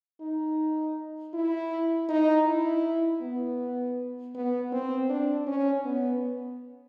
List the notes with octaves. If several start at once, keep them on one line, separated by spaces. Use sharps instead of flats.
D#4
E4
D#4
E4
B3
B3
C4
D4
C#4
B3